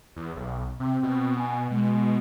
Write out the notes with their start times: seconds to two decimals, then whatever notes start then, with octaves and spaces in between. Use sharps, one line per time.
0.16 E2
0.36 B1
0.80 C3 C4
1.03 B2
1.38 G#5
1.70 B2 G#3